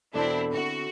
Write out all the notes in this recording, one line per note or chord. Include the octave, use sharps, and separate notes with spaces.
E2 B2 C4 D4 E4 A4 D5
D3 C4 E4 F#4